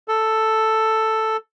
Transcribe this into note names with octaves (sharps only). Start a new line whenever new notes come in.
A4